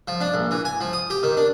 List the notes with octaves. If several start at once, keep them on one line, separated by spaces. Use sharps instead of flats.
F3
D4
A#1
E3
G#5
F3
D#6
G4
D#3
D4